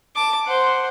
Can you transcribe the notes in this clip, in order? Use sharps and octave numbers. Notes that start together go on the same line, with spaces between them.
A5 D6
C5 F#5